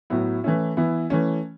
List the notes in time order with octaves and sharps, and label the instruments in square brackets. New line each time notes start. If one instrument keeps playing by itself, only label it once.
[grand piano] A2 F#3 B3 E4
E3 A3 C#4 E4
E3 B3 E4
E3 A3 C#4